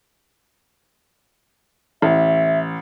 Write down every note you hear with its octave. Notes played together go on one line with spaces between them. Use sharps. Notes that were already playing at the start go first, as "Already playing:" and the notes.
A1 E5